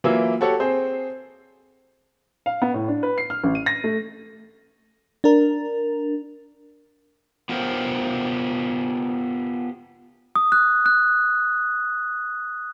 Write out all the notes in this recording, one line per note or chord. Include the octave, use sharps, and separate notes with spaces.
E3 F#3 A#3 E4 F4 E5
F#4 G4 A4 C#5 F#5
C4 G#4 C5
F5
B3
A2
D4
B4
C7
F6
A1
D#7
A#6
A3
D4 A#4
B3 F4 G4 A#4 C5
D#6
F#6
F#6